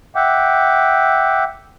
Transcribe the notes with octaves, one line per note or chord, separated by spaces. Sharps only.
E5 F#5 G5 D6